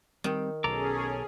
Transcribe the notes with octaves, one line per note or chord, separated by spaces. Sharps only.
D#3 G3 C4
B1 B2 C#4 G#4 A4 A#5 D6